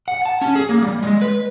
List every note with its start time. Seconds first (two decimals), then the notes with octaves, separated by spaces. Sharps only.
0.08 F#5
0.26 A5
0.41 C#4
0.55 G#4
0.69 A#3
0.82 G3
1.03 G#3
1.22 B4